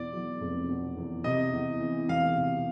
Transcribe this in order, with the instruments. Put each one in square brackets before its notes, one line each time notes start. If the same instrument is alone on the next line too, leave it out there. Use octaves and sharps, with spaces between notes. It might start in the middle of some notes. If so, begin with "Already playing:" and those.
Already playing: [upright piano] E2 B2 [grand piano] D5
[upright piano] F#3
F1
B2
E2
[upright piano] C3 [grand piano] D#5
[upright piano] E2
E3
[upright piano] E1 [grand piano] F5
[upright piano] C3